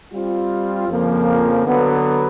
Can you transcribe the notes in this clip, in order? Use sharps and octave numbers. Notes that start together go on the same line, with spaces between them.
G3 C4 F4
F2 C#3 F3 A#3
D3 F#3 B3